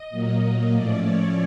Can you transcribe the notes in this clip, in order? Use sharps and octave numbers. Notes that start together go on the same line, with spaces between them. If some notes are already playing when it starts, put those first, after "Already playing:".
Already playing: D#5
A#2 F#3 A#3
A2 F3 A3 C#4 D5
C#5